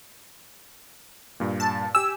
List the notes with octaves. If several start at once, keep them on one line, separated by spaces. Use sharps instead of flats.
G2 A#2
A5
G4 G#5 E6